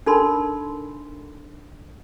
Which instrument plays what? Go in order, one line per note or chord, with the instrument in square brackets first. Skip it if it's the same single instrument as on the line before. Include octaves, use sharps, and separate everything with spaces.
[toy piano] D4 D#4 A4 A#4 B5 C6